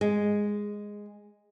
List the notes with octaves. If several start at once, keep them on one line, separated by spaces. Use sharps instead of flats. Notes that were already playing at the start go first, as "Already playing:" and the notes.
G#3